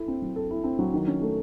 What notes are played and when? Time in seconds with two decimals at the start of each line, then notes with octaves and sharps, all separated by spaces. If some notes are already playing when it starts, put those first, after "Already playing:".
Already playing: E4 A4
0.08 C4
0.22 F#3
0.36 A4
0.51 E4
0.64 C4
0.79 F#3
0.94 D#3
1.07 C#4
1.21 A3